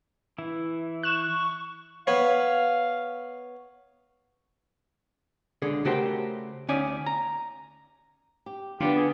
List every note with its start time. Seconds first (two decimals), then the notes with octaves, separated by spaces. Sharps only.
0.38 E3 E4
1.03 C#6 F#6 E7
2.07 B3 C#5 F5
5.62 C#2 D3 G#4
5.85 C#3 A3 F#4 G4 A#4 C5
6.69 D2 C#4 D#4 C#5 D5 G#5
7.06 A#5
8.46 G4
8.80 D3 B3 D4 F4 G4
8.97 G#4